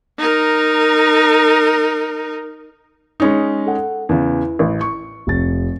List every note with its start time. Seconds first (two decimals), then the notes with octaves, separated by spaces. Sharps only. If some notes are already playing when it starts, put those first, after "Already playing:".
0.18 D#4 A#4
3.20 G#3 C#4 D#4
3.66 A4 F#5
4.09 E2 C#3 E4
4.59 A1
4.81 C#6
5.27 F1 A6